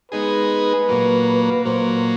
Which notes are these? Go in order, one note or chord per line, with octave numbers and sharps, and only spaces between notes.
G#3 B3 D#4 G#4 B4
A#2 F#3 A#3
A#2 F#3 A#3 C5